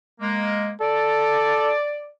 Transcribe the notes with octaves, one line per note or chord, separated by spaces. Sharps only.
G#3 A#3
A4 D5